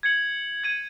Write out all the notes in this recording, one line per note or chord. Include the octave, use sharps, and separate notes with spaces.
G#6 C#7 F#7
G#6 D#7 F#7